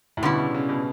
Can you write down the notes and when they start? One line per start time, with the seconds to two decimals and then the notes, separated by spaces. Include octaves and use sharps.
0.17 A2
0.22 B2 D3 G3 C#4 E4
0.39 C#3
0.54 C#3
0.69 B2